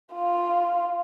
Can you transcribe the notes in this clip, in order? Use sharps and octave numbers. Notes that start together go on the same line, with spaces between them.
F4 F5